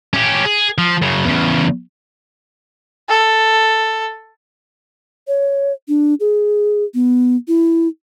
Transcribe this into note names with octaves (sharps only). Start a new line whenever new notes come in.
C#4 G4
G#4
F3
F#2 C#3
E2 C#3
A4
C#5
D4
G#4
B3
E4